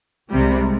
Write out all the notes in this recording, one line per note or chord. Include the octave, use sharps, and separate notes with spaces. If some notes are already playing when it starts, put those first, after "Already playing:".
C2 C3 G3 G#3